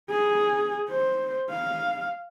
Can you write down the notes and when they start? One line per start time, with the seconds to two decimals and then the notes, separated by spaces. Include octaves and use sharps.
0.10 G#4
0.90 C5
1.51 F5